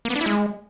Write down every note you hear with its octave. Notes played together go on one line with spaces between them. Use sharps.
A#3
B3
D4
E4
G#3